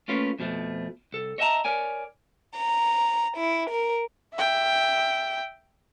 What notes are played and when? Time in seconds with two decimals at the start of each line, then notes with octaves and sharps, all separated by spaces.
0.08 A3 A#3 C#4 F4 B4 C#5
0.39 F2 B2 F3 A3
1.12 C2 A4
1.38 C#5 D#5 E5 G5 A5 A#5
1.65 A#4 C#5 D5 G#5
2.57 A#5
3.37 E4
3.70 A#4
4.34 E5 G5